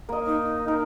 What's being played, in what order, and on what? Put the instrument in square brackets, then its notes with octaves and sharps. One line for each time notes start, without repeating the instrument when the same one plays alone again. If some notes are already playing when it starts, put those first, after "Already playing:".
[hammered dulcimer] A#3 D#5
[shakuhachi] D#4
[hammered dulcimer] A#4